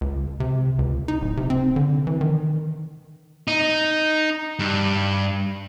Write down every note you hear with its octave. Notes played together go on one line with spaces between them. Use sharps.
C#2
C3
C#2
D#4
D1
C3
C4
D3
E3
D#3
D#4
G2